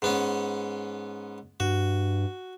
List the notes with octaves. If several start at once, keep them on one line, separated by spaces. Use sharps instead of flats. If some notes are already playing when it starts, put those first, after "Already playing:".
G#2 B3 C#4
G2 F#4